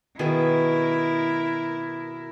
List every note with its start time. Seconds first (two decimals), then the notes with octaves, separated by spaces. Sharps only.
0.19 B2 D#3 E4 G#4 A#4